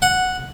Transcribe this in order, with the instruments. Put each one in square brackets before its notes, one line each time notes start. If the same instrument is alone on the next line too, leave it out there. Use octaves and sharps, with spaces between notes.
[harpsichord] F#5